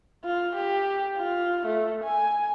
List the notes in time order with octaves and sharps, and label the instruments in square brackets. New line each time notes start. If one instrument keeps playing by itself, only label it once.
[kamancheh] F4
G4
F4
A3
G#5